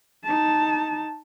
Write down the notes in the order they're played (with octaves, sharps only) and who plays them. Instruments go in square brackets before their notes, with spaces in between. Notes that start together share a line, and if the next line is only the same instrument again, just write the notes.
[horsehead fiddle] D#4 A5